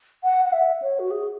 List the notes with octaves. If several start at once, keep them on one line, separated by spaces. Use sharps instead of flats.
F#5
F#5
E5
C#5
F#4
G#4